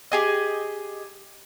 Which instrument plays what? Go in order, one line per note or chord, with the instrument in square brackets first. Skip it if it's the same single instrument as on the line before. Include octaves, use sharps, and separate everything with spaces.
[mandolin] G4 G#4 D#5